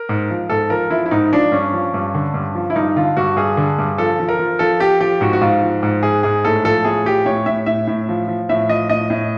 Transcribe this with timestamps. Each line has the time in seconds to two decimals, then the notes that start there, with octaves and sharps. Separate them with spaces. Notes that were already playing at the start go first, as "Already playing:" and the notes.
Already playing: A#4
0.09 G#2
0.30 F3
0.50 G#2 A4
0.70 F3 A#4
0.90 F3 E4
1.06 E4
1.11 G#2 D#4
1.32 F3 D4
1.52 G2 C#4
1.73 F3
1.94 G2
2.14 D3
2.34 G2
2.55 F3
2.70 E4
2.76 G2 D#4
2.96 D3 F4
3.17 G2 F#4
3.36 G2 G#4
3.57 D3
3.78 G2
3.98 F3 A4
4.19 F3
4.29 A#4
4.39 F3
4.59 F3 A4
4.80 F3 G4
5.00 F3 G4
5.21 G#2 F#4
5.33 F#4
5.41 G#2 F4
5.62 F3
5.83 G#2
6.03 G#2 G#4
6.23 G#2 G#4
6.45 A2 A4
6.64 F3 A4
6.85 A2 G#4
7.06 F3 G4
7.26 A2 C#5
7.46 A2 E5
7.66 A2 E5
7.87 A2
8.09 F3
8.28 F3
8.49 A2 E5
8.69 F3 D#5
8.89 A2 D#5
9.10 A2